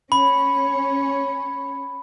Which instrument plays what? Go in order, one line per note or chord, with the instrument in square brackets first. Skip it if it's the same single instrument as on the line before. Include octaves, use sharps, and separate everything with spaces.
[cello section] C#4 C#5 [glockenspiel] B5